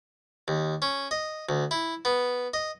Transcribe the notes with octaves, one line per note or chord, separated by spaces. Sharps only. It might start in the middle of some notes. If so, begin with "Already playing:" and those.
D#2
C#4
D#5
D2
E4
B3
D#5